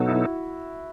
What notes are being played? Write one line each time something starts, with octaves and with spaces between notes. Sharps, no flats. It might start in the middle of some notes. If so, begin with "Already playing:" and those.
Already playing: B2 F#3 B3 D#4 F#4 A4
E4